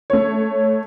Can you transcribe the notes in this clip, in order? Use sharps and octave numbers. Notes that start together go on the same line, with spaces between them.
A3 C#5